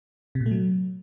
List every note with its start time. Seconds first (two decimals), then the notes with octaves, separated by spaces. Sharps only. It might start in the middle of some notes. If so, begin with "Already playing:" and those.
0.35 C3
0.41 A#2
0.46 A3
0.51 F#3